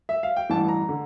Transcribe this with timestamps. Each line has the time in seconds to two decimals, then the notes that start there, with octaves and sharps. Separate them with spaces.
0.09 E5
0.23 F5
0.36 G5
0.49 A1 G2 E3 A5
0.68 A#5
0.89 D3